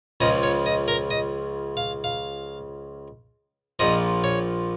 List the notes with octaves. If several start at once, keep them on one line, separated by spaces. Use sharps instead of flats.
C#2 C#3 F3 D#5
C#5
D#5
A#4
D#5
F5
F5
A#1 A#2 F3 D#5
C#5